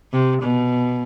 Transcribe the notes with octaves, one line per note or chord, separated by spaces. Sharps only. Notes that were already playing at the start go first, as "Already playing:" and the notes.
C3
B2